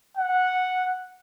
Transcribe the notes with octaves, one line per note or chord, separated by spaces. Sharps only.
F#5